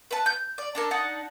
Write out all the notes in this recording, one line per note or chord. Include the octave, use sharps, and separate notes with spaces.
B4 A5
G6
D5
D4 A4 A#4
D4 D#4 F#5 A5